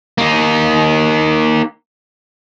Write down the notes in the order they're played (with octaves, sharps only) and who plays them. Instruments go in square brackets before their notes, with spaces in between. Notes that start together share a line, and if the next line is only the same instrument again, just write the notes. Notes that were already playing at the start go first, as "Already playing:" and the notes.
[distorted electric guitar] A#3 D#4